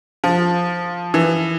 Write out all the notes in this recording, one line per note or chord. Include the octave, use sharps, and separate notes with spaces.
F3
E3